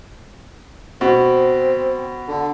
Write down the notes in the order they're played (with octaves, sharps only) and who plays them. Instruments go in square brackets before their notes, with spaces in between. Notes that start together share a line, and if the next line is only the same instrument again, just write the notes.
[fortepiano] B2 [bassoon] C4
[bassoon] D3